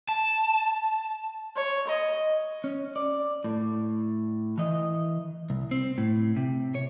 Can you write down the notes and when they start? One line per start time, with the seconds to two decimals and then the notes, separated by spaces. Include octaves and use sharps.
0.09 A5
1.56 C#5
1.87 D#5
2.64 C#4
2.96 D5
3.44 A2
4.58 E3 D#5
5.50 C2
5.71 C4
5.98 A2
6.36 C3
6.75 C#5